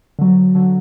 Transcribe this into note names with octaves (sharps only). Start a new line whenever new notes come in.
D3 F#3
D3 F#3